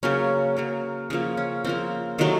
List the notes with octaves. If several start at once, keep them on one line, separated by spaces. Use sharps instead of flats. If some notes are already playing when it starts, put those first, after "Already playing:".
C#3 F#3 A#3 C#4
C#3 F#3 A#3
C#3 F3 A#3 C#4
C#4
C#3 F3 A#3 C4
C3 D#3 F#3 A3